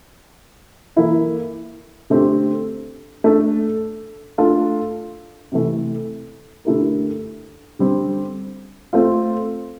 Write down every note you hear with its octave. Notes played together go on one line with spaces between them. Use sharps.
E3 A#3 E4 A4
D3 A3 C4 G4
A3 D4 A4
A3 D4 F4 A4
C3 E3 A3
D3 A3 E4 G4 A#4
D3 G3 C4
A3 C4 F4